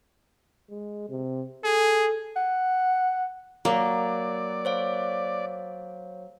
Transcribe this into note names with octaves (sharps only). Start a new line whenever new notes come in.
G#3
C3
G#4 A4
F#5
F#3 A#3 D5
C5 C#5 F5